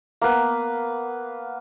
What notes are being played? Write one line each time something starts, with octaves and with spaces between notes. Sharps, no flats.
A#3 B3 B4